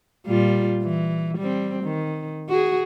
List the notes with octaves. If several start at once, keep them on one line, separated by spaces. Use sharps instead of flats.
A#2 G3 F4
E3
G3 C4
D#3
F#4 G#4